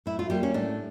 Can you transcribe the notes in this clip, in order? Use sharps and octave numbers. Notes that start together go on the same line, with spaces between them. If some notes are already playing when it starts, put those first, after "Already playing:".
A2 E4
F4
G3 A#3 G4
C#4
A2 D4